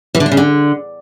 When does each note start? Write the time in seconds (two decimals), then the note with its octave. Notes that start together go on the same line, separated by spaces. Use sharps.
0.15 E3
0.20 D3
0.26 D4
0.32 C#3
0.37 D3